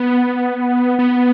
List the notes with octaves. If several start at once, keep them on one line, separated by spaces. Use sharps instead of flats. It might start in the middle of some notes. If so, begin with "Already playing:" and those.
Already playing: B3
B3